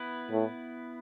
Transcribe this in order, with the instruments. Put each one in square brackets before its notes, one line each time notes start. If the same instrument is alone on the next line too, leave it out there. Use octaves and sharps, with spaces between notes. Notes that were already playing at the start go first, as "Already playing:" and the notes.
Already playing: [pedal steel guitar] B3 E4 B4
[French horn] A2